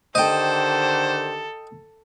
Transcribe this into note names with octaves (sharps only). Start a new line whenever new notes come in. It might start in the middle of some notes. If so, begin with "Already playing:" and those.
D3 D#3 G4 A4 C5 D#5 G5